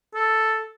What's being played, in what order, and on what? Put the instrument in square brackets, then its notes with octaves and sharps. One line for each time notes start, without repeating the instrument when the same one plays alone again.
[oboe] A4